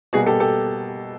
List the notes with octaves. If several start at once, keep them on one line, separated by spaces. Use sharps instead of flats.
B2 G3 A#3 F#4 G#4
G4 A4
G4 A4